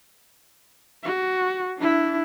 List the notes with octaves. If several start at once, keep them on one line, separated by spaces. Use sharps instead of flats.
F#4
D4 E4